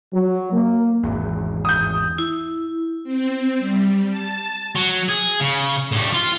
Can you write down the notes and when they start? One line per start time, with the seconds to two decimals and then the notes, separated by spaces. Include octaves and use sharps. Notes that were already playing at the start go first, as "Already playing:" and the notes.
0.13 F#3
0.51 A#3
1.03 G#1 E2
1.65 D#6 G6
2.18 E4
3.04 C4
3.58 G3
4.08 A5
4.76 F#3
5.09 G#4
5.40 C#3
5.92 A2 G3
6.13 F4